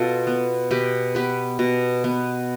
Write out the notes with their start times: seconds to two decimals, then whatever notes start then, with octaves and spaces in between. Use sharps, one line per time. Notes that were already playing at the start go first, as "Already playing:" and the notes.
Already playing: B2 F4 A4
0.27 B3
0.71 B2 G4 B4
1.15 B3 G4 B4
1.59 B2
2.04 B3